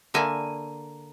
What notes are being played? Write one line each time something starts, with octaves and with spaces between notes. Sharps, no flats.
D3 A#3 E5 G#5